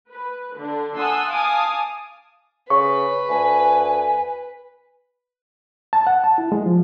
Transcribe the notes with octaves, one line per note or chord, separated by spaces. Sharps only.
B4
D3 D4
F#5 G#5 A5 C6 D#6 E6
F5 G#5 A5 D6 D#6
C#3 B4 C#6
D2 G#5
A5
F#5
A5
E4
G#3
F3